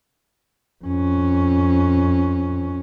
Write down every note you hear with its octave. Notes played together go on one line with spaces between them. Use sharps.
F2 C#4